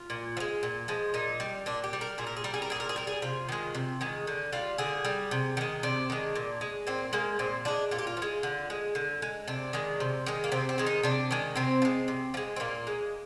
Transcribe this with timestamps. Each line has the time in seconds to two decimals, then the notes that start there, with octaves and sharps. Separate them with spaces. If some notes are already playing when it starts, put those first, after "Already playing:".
Already playing: F4
0.10 A#2
0.37 F3
0.40 G#3
0.63 A#2
0.88 F3 G#3
1.14 A#2 D#4
1.40 G3
1.66 A#2 D4
1.84 G4
1.93 G3
2.01 A#4
2.18 A#2 G#4
2.27 A#4
2.37 G#4
2.44 G3 A#4
2.54 G#4
2.62 A#4
2.70 A#2 G#4
2.80 A#4
2.89 G#4
2.96 G3 A#4
3.07 G#4
3.22 C3 F4
3.49 D#3 G#3
3.75 C3
4.01 D#3 G#3
4.27 D3
4.52 G3 F4
4.78 D3 G#4
5.05 G3
5.31 C3
5.57 D#3 G#3
5.83 C3 D4
6.10 D#3 G#3
6.35 A#2
6.61 G#3
6.87 A#2 C4
7.13 G#3 A#3
7.39 A#2 C4
7.65 F3 G#3 D4
7.91 A#2 F4
7.98 G4
8.07 F4
8.17 F3
8.22 G#3
8.43 D3
8.70 G#3
8.95 D3
9.22 G#3
9.48 C3 D4
9.73 D#3 G#3
10.00 C3
10.26 D#3 G#3
10.44 A#3
10.52 C3 C4
10.69 C4
10.78 D#3 G#3
10.86 D#4
11.03 C3 D4
11.31 D#3 G#3
11.56 C3 C4
11.82 F3
11.85 G#3
12.08 C3
12.34 F3
12.37 G#3
12.56 C4
12.60 A#2 A#3
12.87 G#3